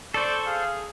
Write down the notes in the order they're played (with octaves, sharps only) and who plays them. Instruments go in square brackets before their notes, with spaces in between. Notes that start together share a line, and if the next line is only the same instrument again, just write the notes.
[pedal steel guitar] A4 C5 [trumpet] D5 [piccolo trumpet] C#6
[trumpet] G#4 [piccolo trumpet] F5